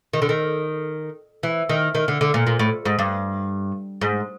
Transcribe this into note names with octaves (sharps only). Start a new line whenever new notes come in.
D#3
D3
D#3
E3
D#3
D#3
D3
D3
A#2
A#2
A2
G#2
G2
G#2